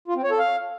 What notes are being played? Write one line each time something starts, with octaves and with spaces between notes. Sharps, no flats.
F4
C4
C#5
A4
F5